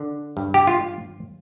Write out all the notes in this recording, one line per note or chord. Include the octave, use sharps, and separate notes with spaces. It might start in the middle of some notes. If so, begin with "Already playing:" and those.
Already playing: D3
G2
G4
F4